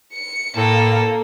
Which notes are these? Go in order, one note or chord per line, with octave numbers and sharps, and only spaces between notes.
C#7
A2 A#3 A4